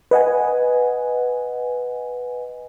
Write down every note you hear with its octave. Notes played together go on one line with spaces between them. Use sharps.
B4 D#5 F#5 G#5